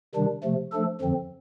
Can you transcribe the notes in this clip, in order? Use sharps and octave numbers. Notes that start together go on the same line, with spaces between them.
C3 D#3 G3 D4
C3 F3 A3
F3 A3 D4 A4
F2 D3 F3 C4